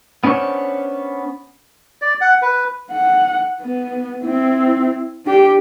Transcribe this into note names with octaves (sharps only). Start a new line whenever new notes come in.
B3 C#4 D4 C5 C#5
D5
F#5
B4
F#5
B3
C4 E4
D4 G4